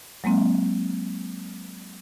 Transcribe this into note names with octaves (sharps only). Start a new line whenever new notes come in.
F#3 G#3 A#3 C4